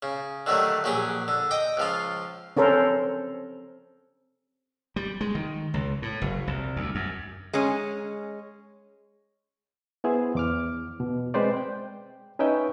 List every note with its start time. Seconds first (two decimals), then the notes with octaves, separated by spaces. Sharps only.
0.03 C#3
0.46 D3 D#3 F#3 G3 A3
0.84 A#1 F#3 G4 G#4
1.28 D3
1.51 D#5 G5 D6
1.77 C#2 F3 F4
2.57 C4 C#4 A4 A#4 C5
4.96 G3
5.21 G#3
5.35 D#3
5.74 C#2
6.02 A2
6.21 F#1
6.47 C2
6.76 D2
6.95 F#2
7.53 G#3 C#4
10.04 B3 E4 G#4 C5
10.35 E2 D6 F6
11.00 B2
11.34 G#3 C4 B4 C5 D5
11.57 G5
12.39 C#4 D#4 B4 D#5 E5 G5